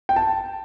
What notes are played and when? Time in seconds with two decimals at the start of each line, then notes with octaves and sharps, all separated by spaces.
0.09 G5
0.16 A5